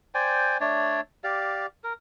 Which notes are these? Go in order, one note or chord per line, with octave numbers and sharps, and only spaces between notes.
C5 D5 G5 G#5
A3 D4 C#5 D5
G4 D5 F5
A#4